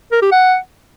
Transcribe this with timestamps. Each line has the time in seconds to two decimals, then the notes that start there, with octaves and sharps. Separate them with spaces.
0.12 A#4
0.22 G4
0.32 F#5